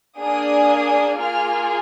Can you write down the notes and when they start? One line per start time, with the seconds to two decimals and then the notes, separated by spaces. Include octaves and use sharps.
0.18 A#3 D4 G#4 D#6
1.18 A#3 F4 G#4 F6